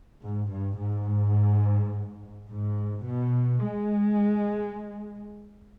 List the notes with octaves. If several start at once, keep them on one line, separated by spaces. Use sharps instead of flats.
G#2
G2
G#2
G#2
B2
G#3